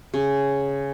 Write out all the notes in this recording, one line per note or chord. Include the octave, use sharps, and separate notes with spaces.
C#3